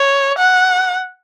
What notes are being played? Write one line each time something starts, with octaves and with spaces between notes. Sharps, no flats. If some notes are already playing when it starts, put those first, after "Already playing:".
Already playing: C#5
F#5